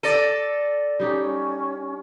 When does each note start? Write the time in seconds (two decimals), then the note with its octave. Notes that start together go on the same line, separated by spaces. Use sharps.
0.03 A4 D5 A6 A#6 D#7
1.00 G3 C#4 D#4 G4